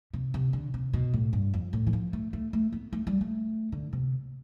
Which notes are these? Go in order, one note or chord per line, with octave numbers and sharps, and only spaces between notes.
C3
C3
D3
C3
B2
A2
G2
F2
A2
E3
F3
A3
A3
A3
B3
A3
G3
A3
D3
C3